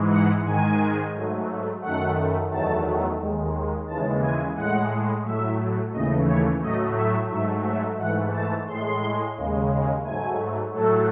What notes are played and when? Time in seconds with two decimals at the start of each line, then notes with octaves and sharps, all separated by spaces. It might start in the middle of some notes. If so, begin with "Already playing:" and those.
Already playing: G#2 E3 G#3
0.10 F#5
0.45 G#2 D#3 G#3 G#5
1.14 G#2 F#3 A3
1.82 F#2 D#3 A3 F#5
2.50 E2 D#3 F#3 A3 A5
3.20 D#2 D#3 G#3
3.87 D#2 C#3 E3 G#3 A5
4.22 G#5
4.56 A2 G#3 F#5
5.24 A2 F#3 A3 E5
5.93 D#2 C#3 E3 A3 D#5
6.27 C#5
6.61 A2 F#3 A3 D#5
6.96 E5
7.30 G#2 F#3 A3 E5
7.65 E5
7.98 G#2 E3 A3 F#5
8.33 A5
8.67 A2 G#3 C6
9.35 D#2 C#3 G#3
10.04 G#2 F#3 A3 G#5
10.73 A2 F#3 A3 A4